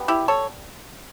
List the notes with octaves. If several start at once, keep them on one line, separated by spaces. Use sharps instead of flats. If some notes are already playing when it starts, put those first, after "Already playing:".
Already playing: B2 G3 B3
E4 G4
A4 C#5